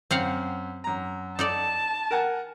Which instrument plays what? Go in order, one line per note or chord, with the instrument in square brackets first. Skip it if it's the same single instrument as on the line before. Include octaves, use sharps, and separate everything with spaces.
[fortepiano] F#2 [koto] C4 F5 F#5
[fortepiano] F#2 A#5
[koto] D#4 A4 D5 [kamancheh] A5
[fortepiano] A#4 F#5 G#5